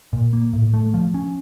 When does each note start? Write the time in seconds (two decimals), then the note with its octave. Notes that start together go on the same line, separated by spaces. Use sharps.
0.13 A#2
0.33 A#3
0.53 A2
0.74 A3
0.94 F3
1.14 C#4